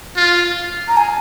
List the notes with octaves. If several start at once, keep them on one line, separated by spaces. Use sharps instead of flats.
F4
A#5
G#5